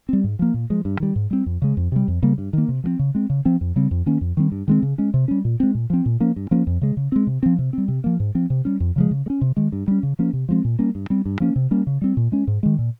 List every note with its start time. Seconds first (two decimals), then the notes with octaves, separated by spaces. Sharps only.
0.09 G3 C4
0.24 G#2
0.39 F3 A#3
0.54 A#2
0.70 F3 G#3
0.85 G2
1.00 D#3 G3
1.16 G#2
1.31 G3 C4
1.46 F2
1.62 C#3 G#3
1.77 F2
1.92 C3 G3
2.08 F2
2.23 C#3 G3 A#3
2.38 G2
2.53 D#3 A#3
2.68 C3
2.84 F3 G#3 C4
2.99 C#3
3.15 G#3 C4
3.30 C#3
3.45 F3 C4
3.61 F2
3.76 C#3 G3 C4
3.91 F2
4.06 D#3 A#3 C#4
4.21 F2
4.37 D#3 G3 C4
4.52 G2
4.68 D#3 G#3 C4
4.83 C#3
4.98 G#3 C#4
5.14 C3
5.28 G3 C#4
5.45 A#2
5.60 G#3 C4
5.75 A#2
5.90 F3 C4
6.06 A#2
6.20 F3 A#3 C#4
6.36 G2
6.51 F3 A#3 C#4
6.67 F2
6.82 C#3 G#3
6.97 C#3
7.12 G#3 C4
7.27 C3
7.43 F3 C4
7.59 C3
7.73 G3 C4
7.88 C3
8.04 F3 A#3
8.20 G#2
8.35 F3 C4
8.50 C3
8.65 G3 C#4
8.80 F2
8.96 C#3 F3 G#3
9.11 C#3
9.26 G#3
9.30 C#4
9.41 C3
9.57 D#3 G#3
9.72 G2
9.88 G3 C#4
10.03 C#3
10.19 F3 A#3 C#4
10.33 C3
10.49 F3 G#3 C4
10.65 A#2
10.79 G3 A#3 C#4
10.95 G2
11.10 G3 C4
11.26 G2
11.40 F3 A#3 C#4
11.56 C3
11.71 G3 A#3 C#4
11.87 C#3
12.02 G3 C4
12.17 A#2
12.32 G#3 C#4
12.47 G#2
12.63 D#3 G#3
12.79 A#2